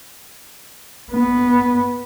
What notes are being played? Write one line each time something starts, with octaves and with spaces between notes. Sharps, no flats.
B3